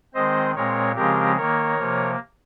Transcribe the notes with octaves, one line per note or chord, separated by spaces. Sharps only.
D#3 G#3 C4 C5 D#5
A#2 G#3 C4 A#4 C#5
C#3 F3 G#3 C4 G4 A#4
D#3 A#3 A#4 C#5
C3 F3 A#3